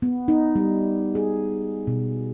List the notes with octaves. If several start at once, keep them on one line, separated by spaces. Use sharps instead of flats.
B3
D#4
G3
G#4
B2